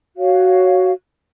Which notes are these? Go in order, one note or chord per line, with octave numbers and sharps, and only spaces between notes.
F#4 C#5 F5